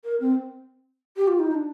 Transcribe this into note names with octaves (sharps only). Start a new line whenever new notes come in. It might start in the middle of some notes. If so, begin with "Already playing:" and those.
A#4
C4
G4
F4
D#4
D#4
D4